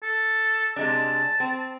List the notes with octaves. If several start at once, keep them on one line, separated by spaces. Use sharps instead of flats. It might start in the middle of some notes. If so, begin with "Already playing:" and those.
A4
C3 G#3 D4 A5
C4